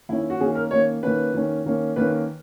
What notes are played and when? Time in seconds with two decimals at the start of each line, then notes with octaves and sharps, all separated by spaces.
0.09 D#3 A#3 C#4 E4
0.30 F#4
0.40 D#3 A#3 C#4 G#4
0.55 A#4
0.71 D#3 A#3 C#4 C#5
1.03 D#3 A#3 C#4 B4
1.34 D#3 A#3 C#4
1.65 D#3 A#3 C#4
1.96 D#3 A#3 C#4 B4